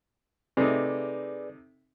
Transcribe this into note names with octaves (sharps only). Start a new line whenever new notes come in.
C3 A3 D#4 G#4 B4 D5